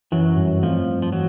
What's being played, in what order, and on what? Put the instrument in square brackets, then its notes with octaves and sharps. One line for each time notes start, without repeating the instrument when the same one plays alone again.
[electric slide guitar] F#2 F#3 [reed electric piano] E3
[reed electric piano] G2
[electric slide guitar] F2 F3 [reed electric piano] A3
[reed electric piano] G2
[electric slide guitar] F3
[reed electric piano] E3 [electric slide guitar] F#3